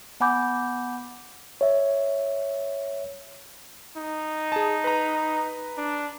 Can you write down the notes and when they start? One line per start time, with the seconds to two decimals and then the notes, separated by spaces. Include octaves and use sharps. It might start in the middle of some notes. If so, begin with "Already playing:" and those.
0.20 B3 F#5 G#5 B5 D6 G6
1.61 C#5 E5
3.97 D#4
4.52 G#4 A5
4.84 B4 A#5
5.77 D4